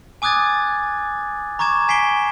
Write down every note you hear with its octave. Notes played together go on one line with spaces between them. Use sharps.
G#5 D6 D#6 F#6 G#6 A6
A#5 C#6 D6 G#6 E7
G#5 B6 C7 D7 G7